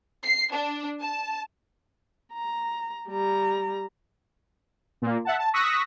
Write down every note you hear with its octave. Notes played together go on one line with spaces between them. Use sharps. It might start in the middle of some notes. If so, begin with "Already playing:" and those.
C7
D4
A5
A#5
G3 A#5
A#2 A#3
E5 F#5 A5
A5
C#6 D#6 E6 F#6 A#6 B6